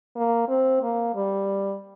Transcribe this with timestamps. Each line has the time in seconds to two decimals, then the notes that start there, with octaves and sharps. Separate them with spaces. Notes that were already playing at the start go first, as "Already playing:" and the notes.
0.16 A#3
0.48 C4
0.82 A#3
1.15 G3